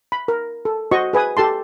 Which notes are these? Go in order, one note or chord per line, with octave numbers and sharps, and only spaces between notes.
B5
A#4
A4
F#4 C5 D#5 C#6
G#4 B4 G#5 D#6
G4 A4 A5 C6